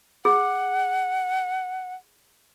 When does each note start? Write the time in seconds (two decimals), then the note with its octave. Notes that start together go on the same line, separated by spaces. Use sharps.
0.25 G#4 F#5